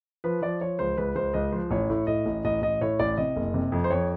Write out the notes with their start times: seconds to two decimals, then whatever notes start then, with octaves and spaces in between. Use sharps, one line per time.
0.24 F3 B4
0.42 F3 D5
0.61 F3 C#5
0.79 C#2 C5
0.98 C#2 B4
1.15 C#2 C5
1.34 C#2 D#5
1.52 F3 C5
1.71 A1 C#5
1.90 A2
2.07 A2 D#5
2.26 A1
2.45 A1 D#5
2.62 A1 D#5
2.81 A2 C#5
2.99 A1 D5
3.17 C3 D#5
3.36 F#1
3.54 C3
3.72 F2
3.84 C5
3.90 F2 C#5